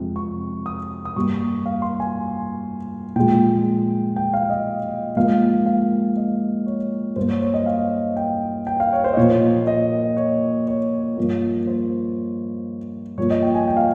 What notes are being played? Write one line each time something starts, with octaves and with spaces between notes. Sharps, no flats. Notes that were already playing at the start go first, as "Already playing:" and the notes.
Already playing: F2 C3 F3 G#3
C#6
D#6
D#6
G2 G3 A#3 C#6
F5
C6
G#5
A#2 F3 G#3 G5
G5
F5
D#5
G#2 F3 A#3 F5
F5
D#5
C#5
G2 G3 A#3 C5
C#5
C#5
D#5
F5
G5
G5
F5
C#5
C5
D#5
A#2 F3 A#3 C#5
D#5
C#5
C#5
G2 F3 A#3
C5
G2 F3 A#3 C#5
D#5
G5
G#5
G5
F5